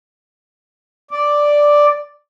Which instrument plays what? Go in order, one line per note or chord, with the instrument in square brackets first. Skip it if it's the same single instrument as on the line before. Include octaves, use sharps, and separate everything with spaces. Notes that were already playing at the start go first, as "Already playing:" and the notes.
[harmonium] D5